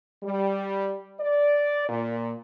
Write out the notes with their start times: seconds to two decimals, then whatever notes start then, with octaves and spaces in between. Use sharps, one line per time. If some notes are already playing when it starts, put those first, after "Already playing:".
0.23 G3
1.20 D5
1.89 A#2